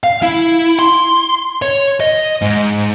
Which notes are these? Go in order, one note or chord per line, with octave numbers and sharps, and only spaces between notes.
F5
E4
C6
C#5
D#5
G#2